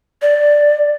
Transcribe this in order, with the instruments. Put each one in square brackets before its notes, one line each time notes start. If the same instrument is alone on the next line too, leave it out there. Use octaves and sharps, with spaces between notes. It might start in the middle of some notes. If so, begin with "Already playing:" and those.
[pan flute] D5